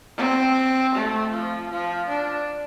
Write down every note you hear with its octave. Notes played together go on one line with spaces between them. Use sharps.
C4
A3
F3
F3
D4